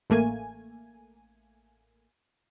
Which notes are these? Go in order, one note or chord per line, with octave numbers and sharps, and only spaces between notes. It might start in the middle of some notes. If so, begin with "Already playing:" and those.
A1 A3 A#3 G#5